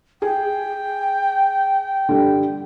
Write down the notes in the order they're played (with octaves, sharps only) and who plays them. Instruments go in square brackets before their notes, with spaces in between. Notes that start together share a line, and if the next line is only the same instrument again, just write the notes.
[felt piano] G#4 [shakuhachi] G5
[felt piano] D3 G3